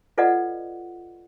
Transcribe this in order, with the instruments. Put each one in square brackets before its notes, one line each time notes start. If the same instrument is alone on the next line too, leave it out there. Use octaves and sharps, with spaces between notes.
[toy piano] F4 A4 B4 D5 D#5 F#5